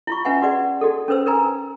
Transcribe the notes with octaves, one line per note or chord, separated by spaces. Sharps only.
E4 F4 C#6
C#4 B4 E5 F#5 G#5
F#4 G#4 B4 D5 F#5
D#4 F#4 G#4 A4
C#4 A4 B4 C5 E6
D#4 A#4 B4 G#5 A#5